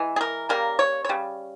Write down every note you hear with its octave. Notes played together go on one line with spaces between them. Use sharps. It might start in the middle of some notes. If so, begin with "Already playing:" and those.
Already playing: E3 G#3
G#4
A#4
C#3 G3 A#3 A#4
C#5
C#5
C#3 G3